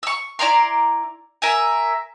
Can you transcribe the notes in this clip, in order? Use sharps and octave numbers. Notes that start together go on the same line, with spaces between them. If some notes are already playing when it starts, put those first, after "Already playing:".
C#6 E6
E4 D5 A#5 C6
A#4 E5 G#5